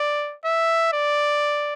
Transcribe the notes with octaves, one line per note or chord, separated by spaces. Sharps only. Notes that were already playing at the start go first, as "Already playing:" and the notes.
Already playing: D5
E5
D5